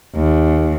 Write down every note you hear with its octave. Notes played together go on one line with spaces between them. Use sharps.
D#2